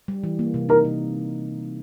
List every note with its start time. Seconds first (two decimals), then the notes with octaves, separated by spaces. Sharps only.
0.08 G3
0.23 E3
0.39 A#3
0.54 C3
0.69 D#4 A#4
0.85 C3